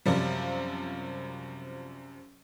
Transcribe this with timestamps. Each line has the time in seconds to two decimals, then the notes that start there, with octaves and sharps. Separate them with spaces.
0.06 F#2 C3 F3 G3